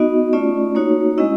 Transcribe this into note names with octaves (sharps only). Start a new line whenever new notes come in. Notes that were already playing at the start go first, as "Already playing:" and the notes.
Already playing: B3 D#4 F#4 D#5
A3 C#4 F4 D5
A#3 D#4 F#4 C#5
G#3 C#4 E4 D#5